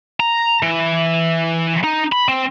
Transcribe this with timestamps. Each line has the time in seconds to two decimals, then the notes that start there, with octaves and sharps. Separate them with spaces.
0.20 A#5
0.63 E3
1.84 D#4
2.12 B5
2.29 C4